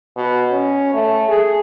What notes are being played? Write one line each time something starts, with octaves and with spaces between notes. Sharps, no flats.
B2
C#4
A3
G#4